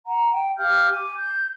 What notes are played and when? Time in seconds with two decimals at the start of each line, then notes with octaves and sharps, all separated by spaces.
0.05 F#5 A#5
0.31 G5
0.57 G4 F5 F6 G6
0.89 G#5 D6
1.15 G6